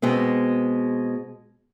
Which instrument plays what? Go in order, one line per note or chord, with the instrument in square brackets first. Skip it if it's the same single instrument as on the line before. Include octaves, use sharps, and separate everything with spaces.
[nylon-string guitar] B2 G#3 B3 C4